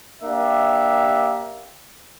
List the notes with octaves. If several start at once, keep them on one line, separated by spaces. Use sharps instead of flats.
A#3 D4 G4 E5